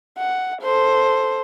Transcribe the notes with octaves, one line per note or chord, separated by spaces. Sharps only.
F#5
A4 C5